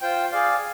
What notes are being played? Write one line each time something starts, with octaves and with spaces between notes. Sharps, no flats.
F4 C5 G5
G#4 D5 F5